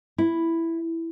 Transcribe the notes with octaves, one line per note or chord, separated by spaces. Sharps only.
E4